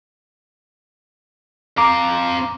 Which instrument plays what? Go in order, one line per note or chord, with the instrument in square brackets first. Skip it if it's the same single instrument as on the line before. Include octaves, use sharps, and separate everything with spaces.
[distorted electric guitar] C4 F5 [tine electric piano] A#5 D6